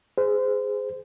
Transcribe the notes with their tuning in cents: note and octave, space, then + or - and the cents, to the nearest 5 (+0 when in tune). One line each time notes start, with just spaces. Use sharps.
G#4 +0 C5 -25